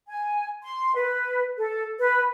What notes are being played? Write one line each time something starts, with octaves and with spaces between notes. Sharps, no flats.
G#5
C6
B4
A4
B4